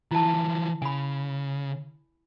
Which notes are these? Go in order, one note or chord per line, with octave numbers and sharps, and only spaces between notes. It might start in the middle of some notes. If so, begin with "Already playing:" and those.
E3 F3 E4 A5
C#3 G#5 B5